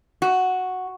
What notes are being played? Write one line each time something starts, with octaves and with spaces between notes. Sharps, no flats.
F#4